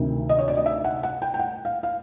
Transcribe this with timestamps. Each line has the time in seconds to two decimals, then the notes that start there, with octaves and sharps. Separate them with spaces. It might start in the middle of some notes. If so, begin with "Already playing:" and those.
Already playing: D2 C3 D#3
0.29 D#5
0.39 C#5
0.48 D5
0.57 D#5
0.66 E5
0.84 F#5
1.03 F#5
1.22 G5
1.34 G5
1.39 F#5
1.65 F5
1.83 F5